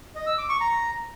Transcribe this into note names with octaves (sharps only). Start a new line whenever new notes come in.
D#5
E6
D6
C#6
A#5